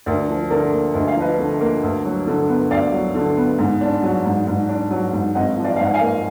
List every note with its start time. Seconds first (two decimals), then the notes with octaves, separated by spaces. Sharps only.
0.06 D2 A#4 D5
0.29 F3
0.50 D3 A#4 D5
0.72 A#3
0.94 D2 D#5
1.08 F5
1.16 F3 B4 D#5
1.38 D3
1.61 A#3
1.83 D2
2.05 F#3
2.27 D3
2.49 B3
2.71 D2 D5 F5
2.93 F#3
3.15 D3
3.37 B3
3.59 G#2
3.81 D4
4.03 F#3
4.25 G#2
4.47 G#2
4.69 D4
4.91 F#3
5.13 G#2
5.35 G#1 D#5 F#5
5.57 F3
5.64 D5 F5
5.76 G#2 F5
5.85 F#5
5.94 F5 G#5
6.01 A#3